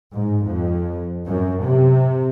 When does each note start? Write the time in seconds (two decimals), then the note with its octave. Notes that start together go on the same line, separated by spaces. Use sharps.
0.13 G#2
0.45 F2
1.26 F#2
1.63 C3